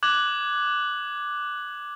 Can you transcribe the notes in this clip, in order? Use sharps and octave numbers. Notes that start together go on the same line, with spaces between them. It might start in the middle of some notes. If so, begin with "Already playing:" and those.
D6 F#6 G#6 F#7